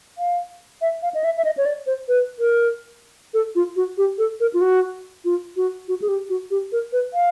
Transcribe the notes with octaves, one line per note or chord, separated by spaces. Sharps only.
F5
E5
F5
D#5
E5
E5
D#5
C#5
D5
C5
B4
A#4
A4
F4
F#4
G4
A4
A#4
F4
F#4
F4
F#4
F#4
G#4
G4
F#4
G4
A#4
B4
F5